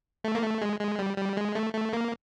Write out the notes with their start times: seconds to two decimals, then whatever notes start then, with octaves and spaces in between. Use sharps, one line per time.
0.24 A3
0.35 A#3
0.43 A3
0.62 G#3
0.80 G#3
0.99 G3
1.18 G3
1.37 G#3
1.55 A3
1.74 A3
1.93 A#3